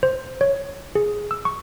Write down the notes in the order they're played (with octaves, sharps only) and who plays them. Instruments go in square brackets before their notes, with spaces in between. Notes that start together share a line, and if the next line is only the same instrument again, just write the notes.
[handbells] C5
C#5
G#4
E6
C#6